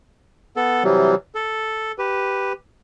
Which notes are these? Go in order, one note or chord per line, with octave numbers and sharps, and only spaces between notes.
B3 A4
C3 E3 F#3 G3
A4
G4 B4